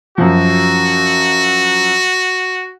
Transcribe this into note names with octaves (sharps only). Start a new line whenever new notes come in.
F#2 F3 F#4